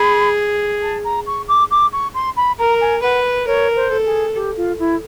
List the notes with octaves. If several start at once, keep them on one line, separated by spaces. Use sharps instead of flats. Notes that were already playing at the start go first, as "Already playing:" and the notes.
Already playing: G#4 B5
A5
A#5
C#6
D6
D6
C#6
C6
B5
A#4 A#5
G#5
B4 F#5
A#4 C#5
C5
A4
G#4
G4
F4
E4